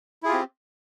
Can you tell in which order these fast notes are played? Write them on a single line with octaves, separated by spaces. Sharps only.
E4 G#4 F4 G4 C4